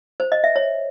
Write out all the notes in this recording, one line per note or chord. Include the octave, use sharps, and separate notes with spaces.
C5
D#5
E5
C#5